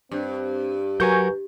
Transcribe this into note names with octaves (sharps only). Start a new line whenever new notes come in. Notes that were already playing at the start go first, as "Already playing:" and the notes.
G2 C4
F#3 F#4 A#4 B4 G#5 C#6 G6